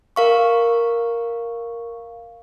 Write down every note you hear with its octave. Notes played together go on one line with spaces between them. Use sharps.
A#4 F5 C#6